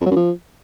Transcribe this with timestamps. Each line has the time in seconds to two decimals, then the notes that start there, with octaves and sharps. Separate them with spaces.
0.01 F2
0.06 F#3
0.11 F#2
0.16 F3